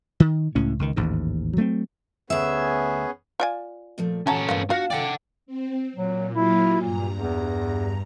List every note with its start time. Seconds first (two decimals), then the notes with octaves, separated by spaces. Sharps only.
0.20 D#3
0.55 C#2 A2 C#4
0.79 C#2 D#3
0.96 A1 D#2 G#2
1.57 F#3 A3 A#3 C4
2.30 D2 B3 C#4 G#4 E5
3.40 F4 D5 G#5
3.98 A#2 F3 A3
4.27 F#3 C#4 A4 C#5 A5 A#5
4.49 G2 B2 A#3 F4
4.70 D4 F4 F#4 F5 A5
4.90 A4 D5 E5 F#5 G5
5.46 C4
5.96 A#2 F#3
6.35 F#3 A#3 E4 F4
6.81 G2 A#2 A#5
7.18 E2